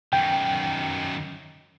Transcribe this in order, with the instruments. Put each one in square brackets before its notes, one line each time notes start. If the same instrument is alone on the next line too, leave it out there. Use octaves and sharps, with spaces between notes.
[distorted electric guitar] F#2 D#3 [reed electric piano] G5